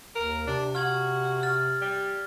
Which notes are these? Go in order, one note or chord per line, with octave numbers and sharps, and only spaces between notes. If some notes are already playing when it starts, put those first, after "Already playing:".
D#2 A#4
C3 D4
F#4 F6 G#6 F#7
F6 A6
G3